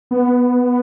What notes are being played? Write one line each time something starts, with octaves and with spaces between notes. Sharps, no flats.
B3